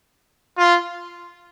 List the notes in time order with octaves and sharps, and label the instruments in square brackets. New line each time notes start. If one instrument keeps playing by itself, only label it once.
[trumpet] F4